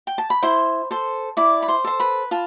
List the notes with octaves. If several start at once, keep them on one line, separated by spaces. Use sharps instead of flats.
G5
A5
B5
E4 C5 C6
A4 C5
E4 D5 D6
B5
C5 C6
A4 C5
B4 B5
F4 A5